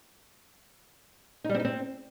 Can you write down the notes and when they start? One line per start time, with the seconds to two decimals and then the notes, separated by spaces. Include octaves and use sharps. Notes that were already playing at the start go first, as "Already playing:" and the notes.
1.44 D#4
1.49 G3
1.55 C4
1.60 D#4
1.65 C4